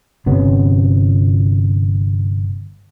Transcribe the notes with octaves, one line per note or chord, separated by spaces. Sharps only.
G1 C3 B3 C#4